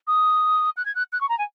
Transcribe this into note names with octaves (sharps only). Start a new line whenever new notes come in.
D#6
F#6
G#6
F#6
F#6
C#6
A#5
G#5